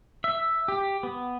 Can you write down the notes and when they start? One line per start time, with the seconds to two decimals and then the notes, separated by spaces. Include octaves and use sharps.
0.24 E5
0.68 G4
1.03 B3